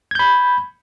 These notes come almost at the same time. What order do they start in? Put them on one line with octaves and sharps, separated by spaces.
G#6 G6 B5